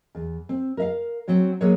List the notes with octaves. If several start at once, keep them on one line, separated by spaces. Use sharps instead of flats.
E2
C4
A#4 E5 F5
F#3 C4 C#5
F#3 G#3 A#3 B3 G#4 C#5